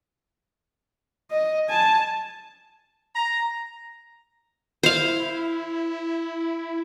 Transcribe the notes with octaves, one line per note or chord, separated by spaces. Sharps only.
D#5
G#5 A5
A#5
E4 C5 F5